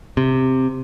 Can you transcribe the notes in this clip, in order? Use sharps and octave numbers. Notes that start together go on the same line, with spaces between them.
C3